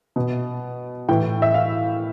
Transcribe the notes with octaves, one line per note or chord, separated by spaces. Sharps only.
B2
A2 E3 G5
E5
F5